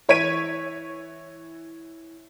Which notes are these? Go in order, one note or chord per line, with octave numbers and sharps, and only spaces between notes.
E3 C#5 G#6 B6 D#7